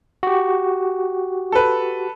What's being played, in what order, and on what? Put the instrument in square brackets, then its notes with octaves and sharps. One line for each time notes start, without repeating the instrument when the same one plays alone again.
[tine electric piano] F#4 G4
[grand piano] A4 B4